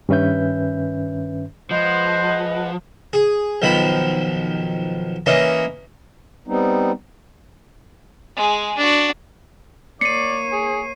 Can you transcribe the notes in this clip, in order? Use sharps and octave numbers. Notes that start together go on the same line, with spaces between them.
G2 D#3 C#4 B4 E5 G6
F3 G#3 B4 C5 D#5 F#5
G#4
B1 D#3 F3 B5
E3 A#3 C#4 D#5
G3 B3 C4 D#4
G#3 G#4
D4 F#4
A#3 C#5 D5 C7 C#7 D#7
G#4